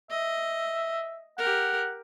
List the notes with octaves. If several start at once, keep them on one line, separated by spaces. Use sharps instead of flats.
D#5 E5
G4 A#4 F#5